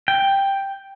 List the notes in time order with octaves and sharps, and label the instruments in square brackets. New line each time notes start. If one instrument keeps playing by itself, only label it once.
[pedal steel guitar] G5